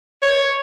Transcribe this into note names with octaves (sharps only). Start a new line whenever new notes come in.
C#5